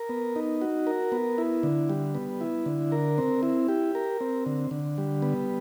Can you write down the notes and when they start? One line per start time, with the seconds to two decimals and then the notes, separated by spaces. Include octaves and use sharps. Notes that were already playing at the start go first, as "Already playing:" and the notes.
Already playing: A#4
0.09 B3
0.36 D#4
0.61 F#4
0.87 A#4
1.12 B3
1.38 E4
1.63 D3
1.89 G3
2.15 B3
2.41 E4
2.66 D3
2.92 A#4
3.18 C4
3.43 E4
3.68 G4
3.95 A#4
4.21 C4
4.46 D3
4.71 D3
4.98 G3
5.22 B3